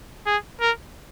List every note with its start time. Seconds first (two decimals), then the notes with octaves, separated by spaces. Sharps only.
0.26 G#4
0.61 A#4